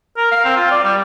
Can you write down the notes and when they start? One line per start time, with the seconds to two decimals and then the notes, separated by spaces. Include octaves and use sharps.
0.17 A#4
0.31 F5
0.45 C4
0.56 F4
0.71 D5
0.84 G3